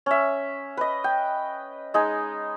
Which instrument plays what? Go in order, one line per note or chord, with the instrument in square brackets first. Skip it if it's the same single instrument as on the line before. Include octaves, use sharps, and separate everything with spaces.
[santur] C#4 E5
B4 D#5
G5
G#3 D#4 G#5